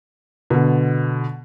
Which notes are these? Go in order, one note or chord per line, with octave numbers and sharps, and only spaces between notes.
B2 D3